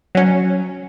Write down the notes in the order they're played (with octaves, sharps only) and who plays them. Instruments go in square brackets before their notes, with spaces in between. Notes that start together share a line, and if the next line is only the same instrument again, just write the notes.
[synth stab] F#3 C#4